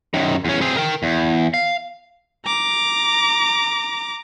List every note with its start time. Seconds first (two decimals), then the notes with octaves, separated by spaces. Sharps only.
0.14 F#2 D#3
0.45 E2 C#4
0.61 C4 G#4
0.77 A#4 G5
1.03 E2
1.54 F5
2.46 A#5 D6